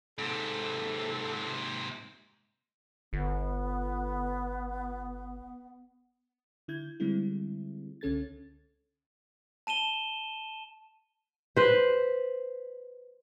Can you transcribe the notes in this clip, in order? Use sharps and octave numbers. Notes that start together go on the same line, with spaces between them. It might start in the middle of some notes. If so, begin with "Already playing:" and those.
G#2 C3 A4
G1 B3
D3 E4 G6 G#6
D3 G3 G#3 C4 E4
C#2 D3 C#4 A4 G#6 A6
A5 D#7 E7 G7
B4 C5